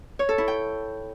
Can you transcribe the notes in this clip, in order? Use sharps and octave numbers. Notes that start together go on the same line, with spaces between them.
C#5
A4
E4
G5